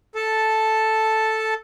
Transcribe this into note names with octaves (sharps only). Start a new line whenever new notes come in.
A4 A5